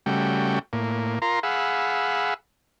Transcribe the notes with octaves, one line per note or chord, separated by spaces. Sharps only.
C#3 G3 A3 F#4 G5
A2 A#3
F4 A#4 A#5 C6
G#4 F5 F#5 B5 E6